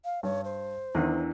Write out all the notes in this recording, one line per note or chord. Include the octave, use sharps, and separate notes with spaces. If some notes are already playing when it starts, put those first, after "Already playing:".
F5
G2 C#5
C5
E2 D#3 E3 D4 E4